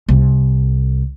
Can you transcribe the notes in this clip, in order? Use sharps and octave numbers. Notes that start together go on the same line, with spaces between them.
C2